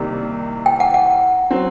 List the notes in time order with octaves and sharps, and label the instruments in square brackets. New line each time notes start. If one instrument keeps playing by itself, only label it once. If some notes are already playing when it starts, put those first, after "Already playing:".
Already playing: [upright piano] C2 C3 D#3 G3 A#3 [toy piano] A#4
[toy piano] G5
F#5
F#5
[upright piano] F#3 C4